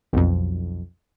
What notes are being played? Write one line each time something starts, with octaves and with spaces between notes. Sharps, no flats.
B1 F2